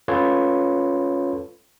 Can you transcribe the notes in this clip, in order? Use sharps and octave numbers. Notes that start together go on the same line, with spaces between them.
C#4 F4 A4 B4 C#5